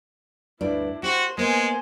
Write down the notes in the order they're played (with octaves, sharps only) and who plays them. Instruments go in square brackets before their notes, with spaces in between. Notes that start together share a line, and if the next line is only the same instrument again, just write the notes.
[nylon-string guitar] D2 G2 D5 [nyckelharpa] D4 E4
[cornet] F#4 [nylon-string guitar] G4 [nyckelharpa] C5
[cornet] G#3 [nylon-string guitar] A#3 B3 [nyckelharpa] C5 G#5